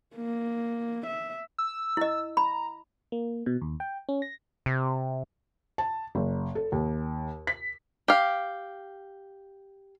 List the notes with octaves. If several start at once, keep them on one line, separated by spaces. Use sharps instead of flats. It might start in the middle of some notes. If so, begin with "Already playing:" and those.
A#3
E5
E6
E4 D#5
A#5 B5
A#3
B2
D#2
G5
C#4
A#6
C3
A5
F#1
A4
D#2
B6
G4 F5